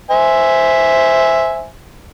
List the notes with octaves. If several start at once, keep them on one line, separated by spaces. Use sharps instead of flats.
C5 E5 G#5